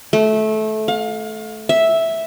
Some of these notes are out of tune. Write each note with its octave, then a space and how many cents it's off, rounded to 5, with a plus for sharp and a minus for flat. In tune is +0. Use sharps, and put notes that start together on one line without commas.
A3 -20
F5 +30
E5 -5